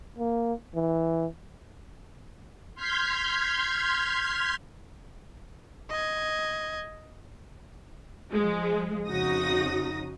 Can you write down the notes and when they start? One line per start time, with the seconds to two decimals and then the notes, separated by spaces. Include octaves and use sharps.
0.19 A#3
0.75 E3
2.75 C6 F6 G6 G#6 B6
5.90 D#5 G#6
8.32 F3 G#3
9.08 F2 C#3 D#4 F#4 D#6 A#6